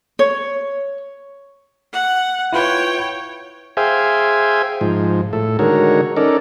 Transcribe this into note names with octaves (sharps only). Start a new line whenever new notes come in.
C#5
F#5
E4 F4 B4 C#5 G5
G#4 C5 E5 F5 G5 G#5
G#2 F3
A2 A4
D3 D#3 G#3 F#4 A#4 C#5
C#4 D#4 A4 A#4 D5